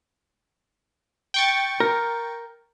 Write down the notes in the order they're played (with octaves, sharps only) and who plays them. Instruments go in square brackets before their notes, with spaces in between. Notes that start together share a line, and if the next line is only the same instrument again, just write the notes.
[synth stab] G5 C#6 A6
[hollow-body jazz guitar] A#4